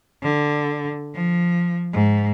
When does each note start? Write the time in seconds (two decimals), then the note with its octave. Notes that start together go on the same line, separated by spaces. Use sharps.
0.23 D3
1.15 F3
1.94 G#2